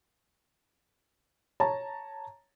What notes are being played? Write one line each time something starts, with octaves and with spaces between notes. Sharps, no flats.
C#5 A5 A#5